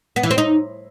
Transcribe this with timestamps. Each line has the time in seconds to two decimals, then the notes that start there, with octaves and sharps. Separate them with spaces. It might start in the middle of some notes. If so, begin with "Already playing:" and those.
0.16 B3
0.23 E3
0.31 C4
0.38 D#4